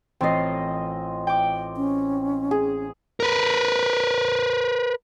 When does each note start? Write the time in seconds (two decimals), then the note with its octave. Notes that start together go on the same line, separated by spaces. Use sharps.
0.21 A1 C4 F4 D#5 C7
1.27 G5 D6
1.77 C#4
2.51 G#4
3.20 A#4 B4